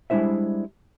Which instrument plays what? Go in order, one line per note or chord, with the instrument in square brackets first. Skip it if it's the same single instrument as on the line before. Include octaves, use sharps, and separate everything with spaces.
[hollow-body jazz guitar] G3 G#3 D4 E4 C5 E5